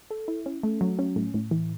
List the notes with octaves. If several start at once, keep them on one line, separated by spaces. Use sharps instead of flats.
A4
E4
C#4
A3
F#3
C#4
A2
A2
E3